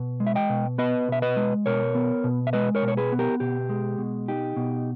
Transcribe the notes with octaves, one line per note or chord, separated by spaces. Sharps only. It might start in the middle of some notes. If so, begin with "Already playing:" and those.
Already playing: B2
G#3
E5
D#5 G5
B2
B3 B4 D#5
B2 E5
B4 D#5
G#3
B2 A#4 C#5
B3
B2
E5
G#3 B4 D#5
A#4 C#5
B2
C#5
G#4 B4
B3
G4 A#4
B2 G4
G#3
B2
D#4 G4
B2